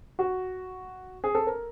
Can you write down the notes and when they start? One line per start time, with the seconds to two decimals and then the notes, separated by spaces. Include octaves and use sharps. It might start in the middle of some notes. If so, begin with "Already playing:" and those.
0.19 F#4
1.24 G#4
1.35 A4
1.47 A#4